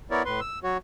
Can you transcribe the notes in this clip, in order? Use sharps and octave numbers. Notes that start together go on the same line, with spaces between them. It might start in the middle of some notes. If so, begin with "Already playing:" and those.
B3 E4 A#4 C#5 D5
A2 B4 C6
E6
F#3 F#4 C#5